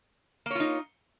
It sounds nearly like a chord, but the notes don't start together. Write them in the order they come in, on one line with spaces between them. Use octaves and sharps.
A#3 C#5 F4 D#4